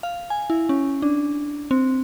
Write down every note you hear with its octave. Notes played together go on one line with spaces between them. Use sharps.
F5
G#5
E4
C#4
D4
C4